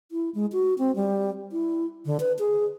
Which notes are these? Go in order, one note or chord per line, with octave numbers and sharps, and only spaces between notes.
E4
G#3
F#4
C4
G3
E4
D3
B4
G#4